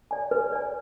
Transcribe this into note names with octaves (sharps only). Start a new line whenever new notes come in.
D5 G#5
B4
D5 G#5